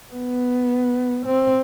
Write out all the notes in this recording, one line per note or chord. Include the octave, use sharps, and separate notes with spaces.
B3
C4